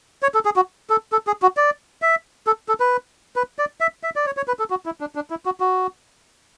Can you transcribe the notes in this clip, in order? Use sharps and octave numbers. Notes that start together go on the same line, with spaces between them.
C#5
A4
G#4
F#4
A4
A4
G#4
F#4
D5
E5
A4
A4
B4
B4
D5
E5
E5
D5
C#5
C#5
B4
A4
F#4
E4
D4
D4
E4
F#4
F#4